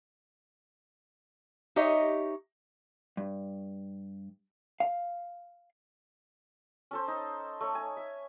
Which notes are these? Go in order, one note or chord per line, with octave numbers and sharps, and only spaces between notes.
D#4 G4 C#5 D#5 E5
G2
F5
C#4 A4 C5
D#4
A3 C#5
G#5
E5